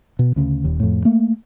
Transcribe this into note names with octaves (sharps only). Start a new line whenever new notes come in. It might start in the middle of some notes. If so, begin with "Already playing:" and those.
B2
D2 C#3
D#1 D#2
F2 A2
A3 A#3